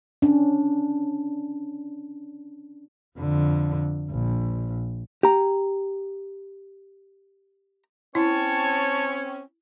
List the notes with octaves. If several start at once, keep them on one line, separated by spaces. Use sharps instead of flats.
C#4 D4
F2 D3
A#1
G4 A#5
C4 C#4 E4 C#5 A5